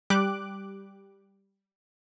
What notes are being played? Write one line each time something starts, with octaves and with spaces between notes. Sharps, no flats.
G3 G4 D6 F#6